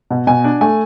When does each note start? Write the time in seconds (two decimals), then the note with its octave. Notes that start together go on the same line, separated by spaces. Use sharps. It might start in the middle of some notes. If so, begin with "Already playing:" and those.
0.11 B2
0.27 B2 G#5
0.44 D4
0.61 A3 G#5